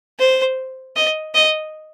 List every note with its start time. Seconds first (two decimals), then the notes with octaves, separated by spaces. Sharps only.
0.19 C5
0.96 D#5
1.35 D#5